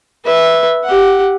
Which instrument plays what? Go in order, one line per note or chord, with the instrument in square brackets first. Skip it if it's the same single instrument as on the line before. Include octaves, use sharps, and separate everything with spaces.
[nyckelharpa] B4 E5
G4 F#5